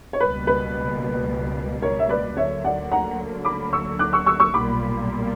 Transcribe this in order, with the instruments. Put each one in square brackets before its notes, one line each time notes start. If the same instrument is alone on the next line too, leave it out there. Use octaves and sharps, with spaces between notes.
[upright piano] C#5
[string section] C#2 B2 G3 A#3 [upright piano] B4
[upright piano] B4
A#4 C#5
E5
B4 D5
[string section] D2 D3 F#3 A#3 [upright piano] C#5 E5
[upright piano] D5 F#5
F#5 A#5
B5 D6
C#6 E6
D6 F#6
C#6 E6
C#6 E6
C#6 E6
[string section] B1 A#2 G3 A#3 [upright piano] B5 D6